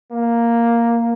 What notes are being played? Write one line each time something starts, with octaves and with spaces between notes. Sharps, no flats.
A#3